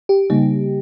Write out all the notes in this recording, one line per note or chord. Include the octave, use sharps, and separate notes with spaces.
G4
C#3 G3 A#3 D#4